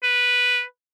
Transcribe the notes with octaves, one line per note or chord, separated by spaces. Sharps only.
B4